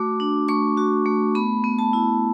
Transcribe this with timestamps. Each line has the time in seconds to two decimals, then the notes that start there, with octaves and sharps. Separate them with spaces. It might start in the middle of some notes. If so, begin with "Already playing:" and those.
Already playing: A3 F#4 D6
0.20 D4
0.48 A3 C#6
0.77 F#4
1.06 A3
1.35 B3 B5
1.64 B3
1.79 A5
1.93 E4